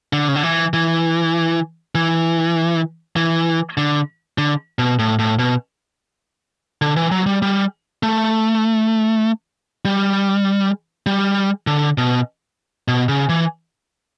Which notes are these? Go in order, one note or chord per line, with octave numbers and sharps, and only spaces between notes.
D3
C#3
D3
E3
E3
E3
E3
D3
D3
B2
A2
A2
B2
D3
E3
F#3
G3
G3
A3
G3
G3
D3
B2
B2
C#3
E3